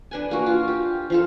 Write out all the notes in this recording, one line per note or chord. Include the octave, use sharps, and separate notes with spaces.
D4 B4 G#5
A#3 F#4
F4
G4
F3 F4 A4